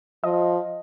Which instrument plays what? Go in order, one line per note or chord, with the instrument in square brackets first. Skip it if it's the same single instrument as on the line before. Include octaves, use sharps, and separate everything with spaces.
[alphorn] F3 [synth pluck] D#5